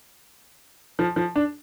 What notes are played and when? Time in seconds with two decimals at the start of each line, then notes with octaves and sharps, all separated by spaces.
0.99 F3
1.16 F3
1.36 D4